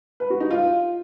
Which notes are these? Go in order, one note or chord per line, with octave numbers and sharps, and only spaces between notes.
B4
F#4
D#4
F4